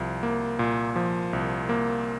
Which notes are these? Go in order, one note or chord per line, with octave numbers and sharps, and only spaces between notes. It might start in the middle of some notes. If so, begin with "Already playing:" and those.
Already playing: C2 F3
A#3
A#2
F3
C2
A#3